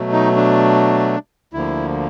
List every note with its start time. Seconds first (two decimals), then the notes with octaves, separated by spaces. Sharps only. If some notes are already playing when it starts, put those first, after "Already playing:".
Already playing: B2 F#3 A3
0.13 D#4
0.36 D4
1.53 D2 D3 F3 A#3 E4